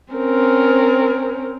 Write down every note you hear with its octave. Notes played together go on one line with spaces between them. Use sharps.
C4 C#4 A#4